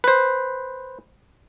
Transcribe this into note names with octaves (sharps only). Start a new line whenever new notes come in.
B4 C5